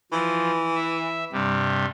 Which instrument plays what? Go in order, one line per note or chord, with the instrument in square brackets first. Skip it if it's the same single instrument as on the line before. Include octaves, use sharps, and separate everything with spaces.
[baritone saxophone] E3 [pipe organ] F3
[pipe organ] E5
G2 C3 G3